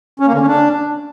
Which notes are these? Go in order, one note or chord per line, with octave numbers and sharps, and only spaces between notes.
C#4
A#3
D3
C#4
D4